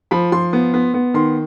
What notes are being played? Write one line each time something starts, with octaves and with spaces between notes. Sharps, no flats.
F3 B5
F3 C6
B3
B3
B3
D#3 C6